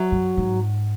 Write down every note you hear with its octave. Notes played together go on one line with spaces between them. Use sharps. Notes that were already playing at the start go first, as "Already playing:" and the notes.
Already playing: F#3
F#2
G#2